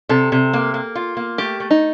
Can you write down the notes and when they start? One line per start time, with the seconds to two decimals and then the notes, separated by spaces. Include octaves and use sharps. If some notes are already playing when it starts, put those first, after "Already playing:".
0.09 C3 A4
0.32 C3
0.53 A#3
0.74 A#3
0.95 F4
1.17 A#3
1.38 A3 G4
1.60 A3
1.71 D#4